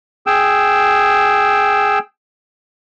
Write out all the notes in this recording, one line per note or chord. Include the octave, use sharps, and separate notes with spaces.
G#4 G5 E6